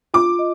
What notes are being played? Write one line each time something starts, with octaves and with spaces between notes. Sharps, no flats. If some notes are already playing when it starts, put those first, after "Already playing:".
F4 D6
D#5